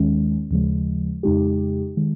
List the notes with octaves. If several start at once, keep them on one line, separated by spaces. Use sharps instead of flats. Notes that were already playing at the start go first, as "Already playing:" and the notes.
Already playing: D#2 D#3 G#3 C#4
D#2 C#3 F3 G#3
F2 C#3 G#3 D#4 G4
D#3 G#3